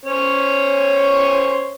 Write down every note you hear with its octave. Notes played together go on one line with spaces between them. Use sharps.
C#4 C5 C#5